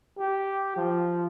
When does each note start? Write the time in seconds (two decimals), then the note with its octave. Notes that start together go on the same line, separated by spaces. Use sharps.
0.19 G4
0.77 F3